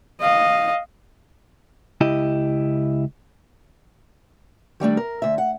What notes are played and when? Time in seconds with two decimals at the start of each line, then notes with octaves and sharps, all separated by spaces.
0.21 D#5 F5
2.01 C#2 E4 G4 D#5
4.80 D#3 G3 A3 D4
4.97 A#4
5.22 D2 E5
5.38 F#5